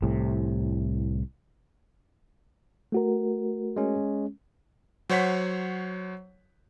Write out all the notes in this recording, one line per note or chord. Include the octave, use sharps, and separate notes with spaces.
C2 A2 C3
A3 F#4 A#4
G#3 C#4
F#3 C5 C#5 F#5 B6